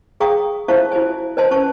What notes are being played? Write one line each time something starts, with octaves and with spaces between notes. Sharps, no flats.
G#4 F5 G5 A#5 C#6 D#6
E4 C5 E5 F5 A5 C#6
E4 F#4 C5 G#5
B4 C5 D#5 G#5 A5 C6
C#4 B4 C5 A5 C#6